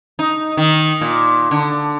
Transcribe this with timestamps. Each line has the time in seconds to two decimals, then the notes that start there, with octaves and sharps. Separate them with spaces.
0.19 D#4
0.57 D#3
1.01 A#2
1.51 D3